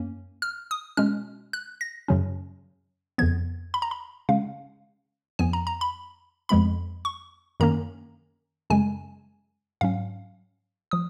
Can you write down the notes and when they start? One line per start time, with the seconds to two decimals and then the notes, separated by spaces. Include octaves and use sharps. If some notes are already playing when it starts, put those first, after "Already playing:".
Already playing: F#2 A#3 C#4
0.42 F6
0.71 D#6
0.97 B2 G#3 C#4 F6
1.53 F#6
1.81 A#6
2.08 F#2 C#3 F#3 C#4
3.18 F2 C#3 F3 B3 G#6
3.74 B5
3.82 A#5
3.91 B5
4.29 C#3 G#3 C#4 F5
5.39 F2 F3 B3 G#5
5.53 A#5
5.67 A#5
5.81 B5
6.49 F2 F3 G#3 B3 B5
7.05 C#6
7.60 F#2 D#3 A#3 C#4 A#5
8.70 F#2 C#3 G#3 G#5
9.81 G#2 F#3 C#4 F5
10.91 F3 D#6